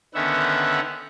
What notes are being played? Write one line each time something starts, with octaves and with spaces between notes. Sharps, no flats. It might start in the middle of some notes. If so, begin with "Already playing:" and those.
D3 D#3 B3 C#4 E5 F#5